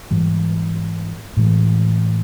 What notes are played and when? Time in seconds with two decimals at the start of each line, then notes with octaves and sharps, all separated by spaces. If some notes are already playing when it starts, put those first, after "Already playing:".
0.11 G#2 E3 G3
1.37 A2 E3 G#3